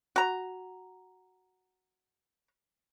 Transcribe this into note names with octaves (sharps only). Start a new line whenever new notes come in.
F#4 A#5